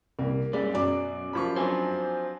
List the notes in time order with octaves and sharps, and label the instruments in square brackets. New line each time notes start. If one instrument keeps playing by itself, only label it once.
[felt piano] C2 [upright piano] A#3
[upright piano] F#2 D5 [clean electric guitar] A#2 G3 [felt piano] G#3
[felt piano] F#2 D5 D6 [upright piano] B2 [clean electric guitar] F#3
[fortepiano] F3 B5 [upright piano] A#4 C5 C#6
[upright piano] F#3 C4 D4 [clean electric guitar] C5 G#5